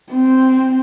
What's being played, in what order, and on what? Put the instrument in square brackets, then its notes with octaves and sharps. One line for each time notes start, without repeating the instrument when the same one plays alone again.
[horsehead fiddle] C4